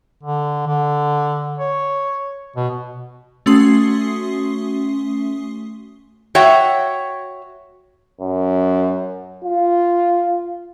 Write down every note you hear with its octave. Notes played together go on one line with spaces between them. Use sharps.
D3
D3
C#5
B2
A3 C#4 F#4 C6 D#6 C7
F#4 C#5 E5 F#5 G5
F#2
F4